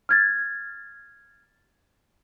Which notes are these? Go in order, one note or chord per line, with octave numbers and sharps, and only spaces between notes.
F6 G#6 A6